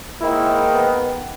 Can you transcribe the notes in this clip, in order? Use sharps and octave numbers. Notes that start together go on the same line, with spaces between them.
G#2 D#3 A#3 E4
B3